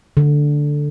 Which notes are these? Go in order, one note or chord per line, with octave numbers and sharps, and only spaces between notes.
D3